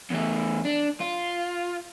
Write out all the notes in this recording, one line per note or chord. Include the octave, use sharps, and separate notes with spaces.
E2 A3
D4
F4